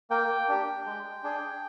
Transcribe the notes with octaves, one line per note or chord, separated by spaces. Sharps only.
A#3 G5
D4 G4
G#3
D4 G#4